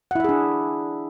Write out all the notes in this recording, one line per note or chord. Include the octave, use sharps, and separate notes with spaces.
D4 E4 G#4 E5 F#5